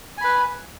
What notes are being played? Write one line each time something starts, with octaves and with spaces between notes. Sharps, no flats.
B4 G#5 B5